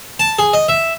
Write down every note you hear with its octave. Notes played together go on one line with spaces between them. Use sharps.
A5
G#4
D#5
E5